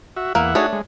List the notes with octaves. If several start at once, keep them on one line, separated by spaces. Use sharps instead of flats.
F#4 E5
E2 A#3 E5 F#5
A3 D4 D#4 F#4 G#4 C#5
G#3